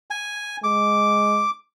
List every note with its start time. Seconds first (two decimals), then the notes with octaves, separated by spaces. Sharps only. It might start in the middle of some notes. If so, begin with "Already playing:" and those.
0.11 G#5
0.64 G#3 D6